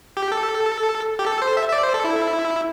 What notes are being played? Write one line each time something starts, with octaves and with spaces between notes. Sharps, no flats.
G4
A4
G4
A4
C5
E5
E5
D5
C5
A4
E4